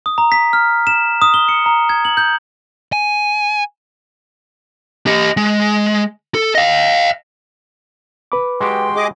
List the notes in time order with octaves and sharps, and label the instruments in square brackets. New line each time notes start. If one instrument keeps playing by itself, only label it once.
[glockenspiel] D#6
A#5
B6
F6
E7
D#6
G7
C#7
A#5
G#6
F#7
G6
[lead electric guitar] G#5
G4 D#5
G#3
A4
D#5 F5
[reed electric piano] B4 B5 D6
[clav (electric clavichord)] G#3 F#4 G4 [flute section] G5 C6
[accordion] G#4 D#5 D6